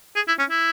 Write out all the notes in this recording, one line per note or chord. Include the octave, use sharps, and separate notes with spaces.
G#4
E4
C#4
E4